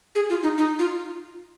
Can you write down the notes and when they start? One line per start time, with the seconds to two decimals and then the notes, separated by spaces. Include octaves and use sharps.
0.15 G#4
0.30 F4
0.43 D#4
0.58 D#4
0.79 F4